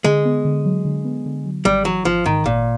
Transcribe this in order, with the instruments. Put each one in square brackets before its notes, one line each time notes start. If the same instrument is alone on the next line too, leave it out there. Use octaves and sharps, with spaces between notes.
[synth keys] D3 [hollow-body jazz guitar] G#3
[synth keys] B3
D3
F#3
D3
B3
D3
F#3
[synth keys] G#1 [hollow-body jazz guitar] G3
[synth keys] E3 [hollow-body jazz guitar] F#3
[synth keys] G#1 [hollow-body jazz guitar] F3
[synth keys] G#2 [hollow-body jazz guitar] D#3
[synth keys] G#1 [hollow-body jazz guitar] A#2